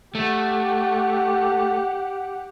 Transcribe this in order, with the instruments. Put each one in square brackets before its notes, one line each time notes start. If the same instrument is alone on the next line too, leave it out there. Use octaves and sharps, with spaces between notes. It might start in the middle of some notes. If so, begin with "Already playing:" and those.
[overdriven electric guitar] A3 [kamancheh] G4 F#5